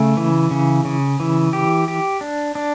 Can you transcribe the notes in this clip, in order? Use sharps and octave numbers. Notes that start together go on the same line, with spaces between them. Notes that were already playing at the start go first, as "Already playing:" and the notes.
Already playing: C#3 A3
E3
C#3
C#3
E3
G4
G4
D4
D4